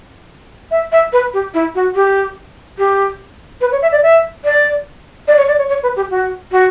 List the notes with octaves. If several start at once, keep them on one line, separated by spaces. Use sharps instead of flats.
E5
E5
B4
G4
E4
F#4
G4
G4
B4
C#5
E5
D5
E5
D5
D5
C#5
D5
C#5
C#5
B4
G4
F#4
F#4